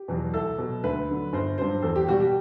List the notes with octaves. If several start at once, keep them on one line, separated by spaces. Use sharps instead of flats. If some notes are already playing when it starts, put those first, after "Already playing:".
Already playing: G4
E2 B2 F#3
C2 A4
B2 F#3
D2 B4
D3 F#3
G1 C5
G2 F#3 C5
E2 A4
G4
B2 G3 F#4
G4